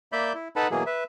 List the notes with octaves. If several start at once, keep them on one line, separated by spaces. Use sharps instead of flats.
A#3 D5 E5 B5 G6
E4
D#4 A4 B4 F#5 A5 B5
B2 E3 F#3 A#3 G#4
B4 E5